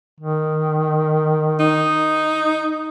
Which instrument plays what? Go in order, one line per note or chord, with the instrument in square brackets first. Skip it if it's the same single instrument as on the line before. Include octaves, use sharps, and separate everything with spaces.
[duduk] D#3
[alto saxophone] D#4